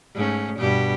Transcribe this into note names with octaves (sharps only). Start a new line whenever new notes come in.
G#2 A3 C#4
G2 B2 G4